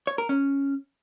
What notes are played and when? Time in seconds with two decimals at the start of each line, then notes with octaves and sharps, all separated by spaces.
0.07 C#5
0.18 A#4
0.29 C#4